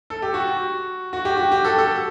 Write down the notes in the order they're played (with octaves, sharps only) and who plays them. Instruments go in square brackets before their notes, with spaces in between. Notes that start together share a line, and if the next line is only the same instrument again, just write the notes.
[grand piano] A4
G4
F#4
F#4
G4
F#4
G4
A4
A4